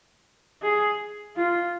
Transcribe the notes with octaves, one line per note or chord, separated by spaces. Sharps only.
G#4
F4